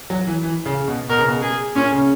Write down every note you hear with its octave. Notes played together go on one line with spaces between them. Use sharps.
F#3
E3
E3
C#3
B2
B2 A#4
C#3
B2
G#4
A#2 C#4
C#3